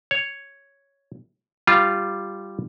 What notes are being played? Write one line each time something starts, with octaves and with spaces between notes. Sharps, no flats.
C#5
G3 F4